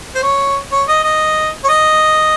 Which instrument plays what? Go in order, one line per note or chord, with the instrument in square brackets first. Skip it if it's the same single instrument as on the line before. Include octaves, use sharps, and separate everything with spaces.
[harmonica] C5
C#5
C#5
D#5
D#5
C#5
D#5